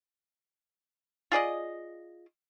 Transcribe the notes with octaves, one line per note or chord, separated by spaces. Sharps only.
F4 G#4 D5 D#5